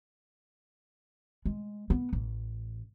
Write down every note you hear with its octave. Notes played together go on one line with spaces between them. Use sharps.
G#3
B3
A1